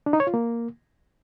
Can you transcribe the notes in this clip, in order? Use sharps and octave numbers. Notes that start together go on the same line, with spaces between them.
D4
D#4
C#5
F4
A#3